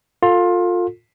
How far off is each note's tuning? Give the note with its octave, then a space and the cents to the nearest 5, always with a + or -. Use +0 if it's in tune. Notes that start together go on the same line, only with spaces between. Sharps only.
F4 +20 A4 +25